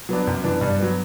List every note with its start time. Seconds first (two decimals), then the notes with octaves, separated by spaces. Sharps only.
0.09 F#3 B3 D4
0.27 F#2
0.44 E3 B3 D4
0.61 G2 D5
0.79 F#3 B3